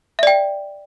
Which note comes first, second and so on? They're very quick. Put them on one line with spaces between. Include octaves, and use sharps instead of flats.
E5 D5 G5